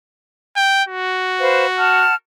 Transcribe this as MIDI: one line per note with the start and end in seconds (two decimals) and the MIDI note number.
0.56 0.83 79
0.89 2.06 66
1.40 1.65 71
1.40 1.65 72
1.40 1.65 77
1.78 2.14 78
1.78 2.14 81
1.78 2.14 89